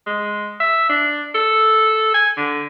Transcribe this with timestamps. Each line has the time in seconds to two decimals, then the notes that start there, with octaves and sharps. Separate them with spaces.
0.07 G#3
0.60 E5
0.89 D4
1.35 A4
2.14 G#5
2.37 D3